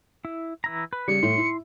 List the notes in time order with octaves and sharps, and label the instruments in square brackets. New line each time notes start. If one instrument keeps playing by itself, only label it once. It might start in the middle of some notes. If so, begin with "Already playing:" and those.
[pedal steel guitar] E4
E3 E4 A#5
B4
[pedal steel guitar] C#3 [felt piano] G3 [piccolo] C#7
[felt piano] A2 [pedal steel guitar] C6
[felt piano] E4